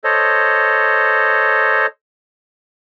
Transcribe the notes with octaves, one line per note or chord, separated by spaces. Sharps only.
A4 C5 C#5 D#5